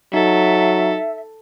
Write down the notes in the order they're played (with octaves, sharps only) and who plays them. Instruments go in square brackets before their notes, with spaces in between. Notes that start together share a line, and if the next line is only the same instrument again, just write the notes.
[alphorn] F#3 [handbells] D#4 [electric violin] A4 [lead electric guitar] E5